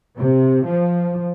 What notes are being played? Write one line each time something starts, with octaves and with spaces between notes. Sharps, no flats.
C3
F3